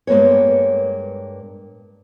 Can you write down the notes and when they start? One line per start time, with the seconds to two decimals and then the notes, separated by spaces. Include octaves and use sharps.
0.07 G2 G#3 A#3 B3 C#5